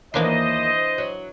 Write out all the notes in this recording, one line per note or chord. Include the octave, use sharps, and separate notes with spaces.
D#2 E3 A#3 D4 C5 D#5 C6
F#3